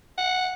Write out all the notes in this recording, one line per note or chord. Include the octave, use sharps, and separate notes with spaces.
F#5